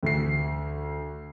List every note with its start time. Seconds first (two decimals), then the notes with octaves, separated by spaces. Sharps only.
0.03 D2 C7